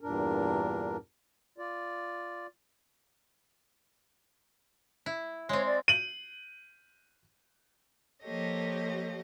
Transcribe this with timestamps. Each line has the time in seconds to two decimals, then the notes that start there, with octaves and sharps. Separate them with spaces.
0.01 E2 G2 A#2 D4 A#4
1.58 F4 D5
5.06 E4
5.49 G#3 C4 C#5
5.66 D5
5.88 D#7 F#7
8.23 F3 A#3 G4 A4 C#5 D#5